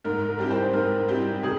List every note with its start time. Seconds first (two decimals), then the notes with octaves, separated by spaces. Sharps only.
0.04 G#2 A#4
0.28 A#4
0.39 G3 C4 E4 G4
0.51 C5
0.73 G#2 A#4
1.08 G3 C4 E4 G4
1.43 C3 G#4